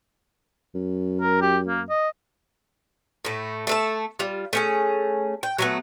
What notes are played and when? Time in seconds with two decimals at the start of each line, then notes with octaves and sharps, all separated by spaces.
0.75 F#2
1.21 A#4
1.42 G4
1.68 A#3
1.90 D#5
3.25 A2 A3
3.67 A3 A4 A5
4.19 G3 F4
4.53 A3 C#4 G#4
5.43 G5
5.58 F#3 A3 B3